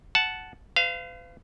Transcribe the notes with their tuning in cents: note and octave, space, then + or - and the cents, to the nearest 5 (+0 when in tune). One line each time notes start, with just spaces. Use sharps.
F#5 +0 A5 -10
B4 +45 F5 -15